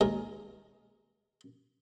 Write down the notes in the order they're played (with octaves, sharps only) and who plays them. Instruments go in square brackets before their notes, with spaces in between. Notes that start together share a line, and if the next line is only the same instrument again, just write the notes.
[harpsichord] D#2 G#3 A#4